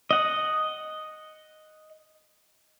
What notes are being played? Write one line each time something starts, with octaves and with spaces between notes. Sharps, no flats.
D#5 F#5